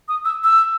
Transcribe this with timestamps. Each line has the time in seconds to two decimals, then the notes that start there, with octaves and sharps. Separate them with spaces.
0.08 D#6
0.25 E6
0.44 E6